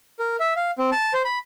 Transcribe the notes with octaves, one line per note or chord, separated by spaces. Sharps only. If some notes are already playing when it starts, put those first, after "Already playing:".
A#4
E5
F5
C4
A5
C5
B5